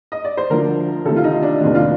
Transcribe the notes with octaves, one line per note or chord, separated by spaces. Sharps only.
D#5
D5
C5
D2 D3 F3 A#4
D2 C3 D#3 A4
F4
D#4
D4
F1 D#2 D#3 D4
F4